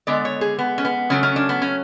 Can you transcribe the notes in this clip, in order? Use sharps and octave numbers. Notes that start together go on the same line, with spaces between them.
D3 G#3 B3 D5
C#5
G#4
B3
C#4
B3
C#3 F#3 A3 C#4
C#4
D4
B3
C#4